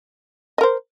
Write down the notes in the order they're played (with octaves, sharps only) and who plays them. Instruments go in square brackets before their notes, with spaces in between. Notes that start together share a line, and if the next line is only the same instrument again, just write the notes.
[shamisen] D#5
A#4
C5